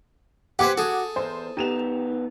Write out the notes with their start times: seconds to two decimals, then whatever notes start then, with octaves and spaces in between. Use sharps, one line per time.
0.59 G4 B4 C5 F#5 D6 G#6
0.78 F#4 G#4 A4
1.16 E2 C5
1.57 D#3 B3 G4 E7 F7